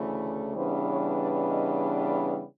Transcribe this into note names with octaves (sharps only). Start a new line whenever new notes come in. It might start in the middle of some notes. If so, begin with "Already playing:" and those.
Already playing: D2 C#3 E3 A3
C#3 E3 G3 B3 D4 C5
C#5
D5
D#5
D5